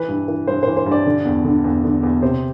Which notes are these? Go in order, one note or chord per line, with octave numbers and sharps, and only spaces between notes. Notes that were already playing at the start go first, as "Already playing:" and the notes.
Already playing: E3 B4
G2
E3
G2 C5
E3 C5
C5
G2
D5
D3
E2
D3
E2
D3
E2
C3 C5